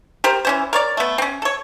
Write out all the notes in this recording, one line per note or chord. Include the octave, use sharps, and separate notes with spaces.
G4 A#4 C5
E3 C#4 C5
A#4 C#5 D5
A3 B3
C4 C#4
A4 C#5